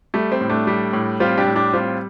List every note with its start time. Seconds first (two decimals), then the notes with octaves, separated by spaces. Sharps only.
0.14 G3 A3
0.32 C4
0.41 A2
0.49 A3 D4
0.67 G3
0.93 A2
1.20 G3 C4 F4
1.38 D4 G4
1.47 A2
1.55 D4 G4
1.73 G3 C4 F4